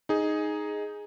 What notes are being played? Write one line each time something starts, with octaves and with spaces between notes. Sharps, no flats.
D#4 G#4